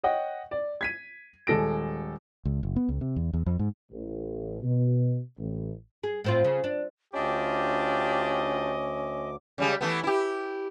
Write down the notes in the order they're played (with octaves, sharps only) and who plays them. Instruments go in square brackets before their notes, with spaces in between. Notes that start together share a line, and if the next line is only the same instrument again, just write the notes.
[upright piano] C#5 D#5 F#5 G5
D5
G#6 B6 D#7
D#1 G#3 A4 A#6 D7
[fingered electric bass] C#2
F#1
B3
C#2
C3
E2
E2
F2
G#2
[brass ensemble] A1
B2
A1
[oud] G#4
A2 C4 F4
C#3
D4
[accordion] D2 D6 [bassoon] C#4 [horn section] D4 F4 G4 [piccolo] D#5
[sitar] C#3 G3 G#3
E3 A3 B3
E4 G4